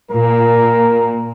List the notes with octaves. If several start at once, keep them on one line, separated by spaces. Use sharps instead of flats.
A#2 A#4